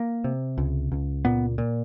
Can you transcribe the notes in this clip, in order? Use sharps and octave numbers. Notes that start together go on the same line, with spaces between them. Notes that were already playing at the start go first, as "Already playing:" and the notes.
Already playing: A#3
C3
C#2
C#2
A#2 B3
A#2